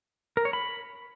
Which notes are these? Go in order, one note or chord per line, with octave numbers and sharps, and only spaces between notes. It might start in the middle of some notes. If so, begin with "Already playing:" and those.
A#4
C#5
B5